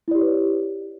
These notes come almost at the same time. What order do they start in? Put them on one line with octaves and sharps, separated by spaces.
E4 D5 G4 C#5 B4